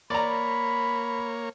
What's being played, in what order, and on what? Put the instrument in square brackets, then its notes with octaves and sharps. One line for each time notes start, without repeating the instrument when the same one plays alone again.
[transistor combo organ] A#3 C#5 [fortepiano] D5 A#5 [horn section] B5